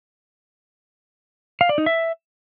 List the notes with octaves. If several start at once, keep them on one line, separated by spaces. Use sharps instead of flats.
F5
D5
D#4
E5